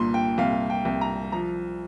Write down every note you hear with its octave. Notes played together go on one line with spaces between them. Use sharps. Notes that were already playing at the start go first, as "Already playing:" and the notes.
Already playing: C2 A#2 C6
G5
C2 F5
G5
C2
A#5
F3 A#5